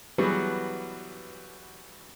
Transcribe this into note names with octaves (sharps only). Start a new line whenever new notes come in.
E3 F#3 G3 B3 F#4 G#4